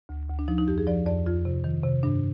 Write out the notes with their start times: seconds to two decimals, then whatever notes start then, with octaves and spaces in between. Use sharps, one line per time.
0.09 D2
0.29 D2
0.39 D4
0.48 F3 D#4
0.58 D#4
0.67 F2 G4
0.78 G#4
0.87 F3 D5
1.06 F2 D5
1.26 F2 F4
1.45 C3
1.64 D#3
1.83 C3
2.03 G2 D4